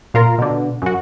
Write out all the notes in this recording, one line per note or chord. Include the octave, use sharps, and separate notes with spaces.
A#2 F4 A#4
B2 D3
F#2 F#4